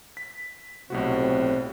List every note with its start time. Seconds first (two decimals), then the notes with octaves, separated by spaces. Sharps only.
0.17 B6
0.90 B1 A2 C3 C4 F#4